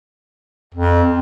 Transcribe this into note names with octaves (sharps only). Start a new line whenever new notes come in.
F2